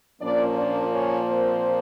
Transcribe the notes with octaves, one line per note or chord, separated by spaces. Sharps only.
A#2 F3 A#3 C#4 D4 D5
D4 D5
C#4 C#5
C4 C5